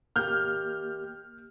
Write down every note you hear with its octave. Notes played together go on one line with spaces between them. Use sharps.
A#3 G4 F6 G6